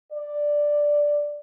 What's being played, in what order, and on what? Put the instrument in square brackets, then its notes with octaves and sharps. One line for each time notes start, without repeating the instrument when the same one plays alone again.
[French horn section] D5